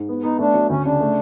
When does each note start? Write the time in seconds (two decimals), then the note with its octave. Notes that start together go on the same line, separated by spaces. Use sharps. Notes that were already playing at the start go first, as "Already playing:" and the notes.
Already playing: G#2
0.09 B3
0.23 B3 D#4
0.39 A3 D4
0.54 F#3
0.69 D2 C#4
0.84 C#3 D4
1.00 A3